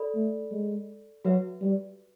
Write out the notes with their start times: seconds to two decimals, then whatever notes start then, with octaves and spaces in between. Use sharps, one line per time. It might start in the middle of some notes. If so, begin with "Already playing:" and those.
Already playing: A4 D5 B5
0.15 A3
0.51 G#3
1.25 F#3 F#4 B4 E5
1.61 G3